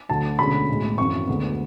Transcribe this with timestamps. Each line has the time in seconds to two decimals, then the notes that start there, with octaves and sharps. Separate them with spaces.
0.09 D2 D3 F#3 A5
0.39 E1 D2 D3 G#3 C#4 B5
0.68 B1 A2 G#3
0.98 G#1 F#2 E3 C#6
1.27 D2 D3 G#3 B3